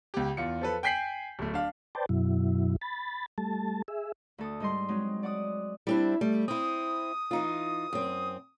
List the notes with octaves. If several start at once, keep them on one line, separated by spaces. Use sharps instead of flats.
C#2 G4
E2 F4 C#7
F3 A4 B4
G5 G#5 G6 B6 C7 F#7
D1 A3
D4 F5
B4 C5 D5 G5 A5
F#2 B2 F#3 E4
B5 A6
G3 A3 A5
G#4 E5
D2 A4 D#6
G#2 G3 D#5 C6
F#3 G#3 C4 D#4
D5 F#5 D6 D#6
G3 C4 D4 E4
G3 A3
C4 E4 D#6
E3 D#4 F4
F#2 C4